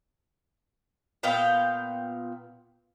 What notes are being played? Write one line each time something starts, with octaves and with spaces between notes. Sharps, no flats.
A#2 B3 F5 G5